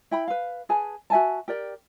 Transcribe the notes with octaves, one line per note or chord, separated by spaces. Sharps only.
E4 G5 B5
B4 F5
G#4 B4 G#5 A5
F#4 E5 G#5 A5
G4 A#4 D5 G5